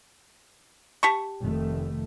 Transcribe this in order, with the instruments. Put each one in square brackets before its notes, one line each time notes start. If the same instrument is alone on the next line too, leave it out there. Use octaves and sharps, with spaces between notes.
[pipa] G4 A5 C#6
[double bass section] F1 D#3 A3